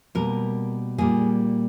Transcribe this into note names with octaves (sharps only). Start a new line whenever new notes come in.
B2 G3 A#3 A#4
A#2 G3 A#3 G#4